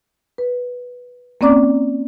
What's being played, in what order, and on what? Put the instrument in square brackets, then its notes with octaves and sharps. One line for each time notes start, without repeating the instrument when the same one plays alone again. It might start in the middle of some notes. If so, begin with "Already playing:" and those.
[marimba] B4
A#3 C4 C#4 D5 A#5 D6